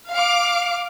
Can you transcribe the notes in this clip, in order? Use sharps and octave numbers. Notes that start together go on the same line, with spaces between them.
F5 D6